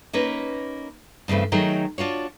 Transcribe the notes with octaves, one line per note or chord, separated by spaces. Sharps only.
A#3 C#4 D#4 B4
G2 C#3 E3 A3 C4
D#3 F#3 A3 D#4 G#4 A#4
D4 F4 F#4 C#5